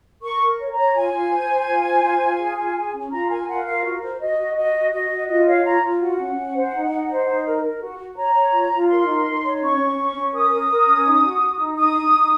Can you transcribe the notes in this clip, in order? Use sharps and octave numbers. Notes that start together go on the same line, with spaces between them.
A#4 C#6
A#4
C#5
A#5
C#5
F4 G#5
F4
C5
C5
F4
C5
F4
F4
G#4
F4
G#4
C#4
F4 A#5
A#4 G#5
F4 F#5
A#4 F5
F#4
C5
F#4 D#5
F#4
F#4 D#5
F#4
F#4 D#5
F#4
F4 D#5
C#5 F5
F4 A#5
F4
F#4 F#5
C#4
C#4
C5
D#4
D#4
C5
D#4
A#4
A#4
F#4
F#4
C#5 A#5
C#5
F4
F4
A#4 C6
D#4
D#4
C#5
C#4 C#6
C#4
C#4
C#4
A#4 D#6
A#4
A#4
C#4
D#4
F#4
F#4
D#4
D#4 D#6
D#4
D#4